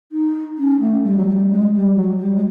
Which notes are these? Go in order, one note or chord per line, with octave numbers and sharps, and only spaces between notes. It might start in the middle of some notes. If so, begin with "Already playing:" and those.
D#4
C#4
A3
G3
F#3
G3
G#3
G3
F#3
G3
G#3